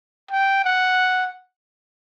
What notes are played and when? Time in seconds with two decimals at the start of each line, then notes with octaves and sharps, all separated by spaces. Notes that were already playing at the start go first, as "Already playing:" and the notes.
0.31 G5
0.65 F#5